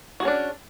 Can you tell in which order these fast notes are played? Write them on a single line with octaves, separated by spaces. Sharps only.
F#4 G#4 C#4 D4